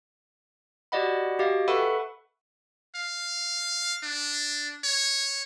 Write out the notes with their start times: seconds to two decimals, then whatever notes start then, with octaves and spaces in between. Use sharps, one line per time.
0.92 F#4 G4 D5 D#5 F#5 B5
1.39 F#4 G4 D#5 F5 G5
1.68 A4 B4 E5 F#5 B5 C#6
2.95 F5
4.03 D4
4.84 C#5